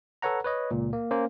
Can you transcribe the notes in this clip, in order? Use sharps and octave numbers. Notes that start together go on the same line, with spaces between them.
A4 B4 C#5 F#5 A#5
B4 C#5 D#5
C#2 A#2
A#3
A#3 C#4 C5